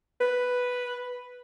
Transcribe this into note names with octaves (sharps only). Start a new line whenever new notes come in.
B4